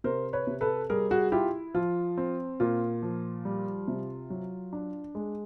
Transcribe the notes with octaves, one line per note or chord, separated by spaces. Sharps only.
C3 A#4 C5
B4 C#5
C3
A4 B4
G3 G#4 A#4
F#4 G#4
E4 F4 G4
F3 F4
C4
A#2 F4
F3
G3
C3
F#3
D4
G#3